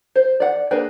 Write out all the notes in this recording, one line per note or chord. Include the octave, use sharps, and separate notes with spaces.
C5
D5 F#5
A#3 D4 G#4 B4 G5